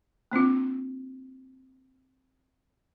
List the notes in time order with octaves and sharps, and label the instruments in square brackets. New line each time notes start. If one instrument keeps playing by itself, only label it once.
[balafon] A#3 C4 D4 F4